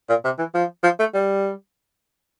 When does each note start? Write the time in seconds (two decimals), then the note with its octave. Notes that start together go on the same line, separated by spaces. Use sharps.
0.09 A#2
0.25 C3
0.39 E3
0.54 F3
0.84 F3
0.99 A3
1.14 G3